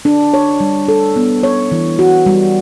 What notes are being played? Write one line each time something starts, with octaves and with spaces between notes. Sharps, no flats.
D4
C#5
G3
A4
B3
C#5
E3
F#4
G3